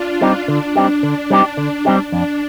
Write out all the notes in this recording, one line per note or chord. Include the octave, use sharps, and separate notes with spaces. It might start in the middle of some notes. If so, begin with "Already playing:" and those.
Already playing: D4 F4
G3 C4 D#4 G4
D3 D4
G3 C4 D#4 G4
D3
G3 C4 D#4 G4
D3
G3 C4 D#4 G4
F2 D4